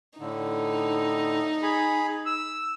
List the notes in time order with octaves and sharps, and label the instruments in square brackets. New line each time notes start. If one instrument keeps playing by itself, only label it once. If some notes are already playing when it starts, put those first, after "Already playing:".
[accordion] A2 D3 [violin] D#4
[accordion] G#4 B5
E6